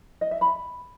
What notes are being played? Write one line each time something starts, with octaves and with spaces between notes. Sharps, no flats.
D#5
E5
B5